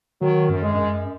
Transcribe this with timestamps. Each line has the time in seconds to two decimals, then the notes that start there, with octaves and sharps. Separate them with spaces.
0.21 D#3 F#3
0.49 F#2
0.62 G#3
0.76 F#2